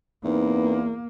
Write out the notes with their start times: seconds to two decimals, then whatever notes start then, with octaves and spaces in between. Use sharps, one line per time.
0.24 E2 A#3 C4 D#4 B4